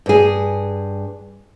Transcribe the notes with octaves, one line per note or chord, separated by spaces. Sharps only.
G2 G#4